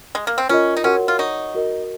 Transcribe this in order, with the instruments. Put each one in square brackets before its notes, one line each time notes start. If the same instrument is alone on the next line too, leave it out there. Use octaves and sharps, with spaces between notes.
[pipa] G#3
A#3
C4
[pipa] C#4 [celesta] F4 A#4 D#5
[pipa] D#4
[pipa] C#4 [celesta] F#4 A#4 C#5 F#5 C6
[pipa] F4
[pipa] D#4 [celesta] C#5 F#5 C#6
[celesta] F#4 A#4 D#5